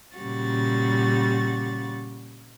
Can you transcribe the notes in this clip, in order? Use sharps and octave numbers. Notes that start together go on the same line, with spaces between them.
A#2 C#3 G3 F#4 A6